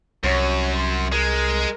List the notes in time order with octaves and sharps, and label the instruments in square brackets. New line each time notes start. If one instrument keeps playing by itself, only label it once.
[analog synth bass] C2 [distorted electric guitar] F#2 [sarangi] C#5
[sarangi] C6
[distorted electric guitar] G#3 [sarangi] A#4